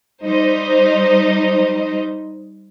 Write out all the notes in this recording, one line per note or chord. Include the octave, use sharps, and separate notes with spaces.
G3 D#4 C5 D#5